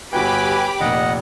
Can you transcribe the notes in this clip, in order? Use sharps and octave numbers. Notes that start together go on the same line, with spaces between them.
G1 F#4 G4 B4 G5 G#5 B5 D6
F1 A#2 D#5 F#5